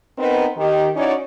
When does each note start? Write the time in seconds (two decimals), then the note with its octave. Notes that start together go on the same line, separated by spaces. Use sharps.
0.18 B3 C4 D#4 A#4 B4
0.57 D#3 G4
0.95 C#4 D#4 E4 F#4 C#5 D5